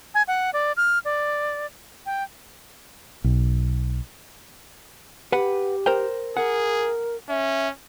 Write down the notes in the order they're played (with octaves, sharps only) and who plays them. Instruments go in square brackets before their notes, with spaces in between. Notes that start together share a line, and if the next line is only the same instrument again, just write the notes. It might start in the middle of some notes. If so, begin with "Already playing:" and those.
[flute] G#5
F#5
D5
F6
D5
G5
[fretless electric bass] B1
[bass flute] G4 [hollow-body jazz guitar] B4 F#5
[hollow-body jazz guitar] A#4 C5 G5
[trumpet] G#4 [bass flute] A#4 [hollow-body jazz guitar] F#5
[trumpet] C#4 [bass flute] E5